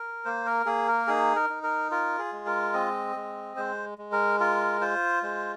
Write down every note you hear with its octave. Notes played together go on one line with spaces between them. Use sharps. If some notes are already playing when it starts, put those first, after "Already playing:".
Already playing: A#4
A#3 C5
A#4
A#3 G#4
A#4
D#4 G#4
A#4
D#4
A#4
F4 A#4
G#4
G#3
A#4
C4 D#5
G#3
G#3 C5
G#3
A#4
F4 A#4
F4 C5
G#3 C5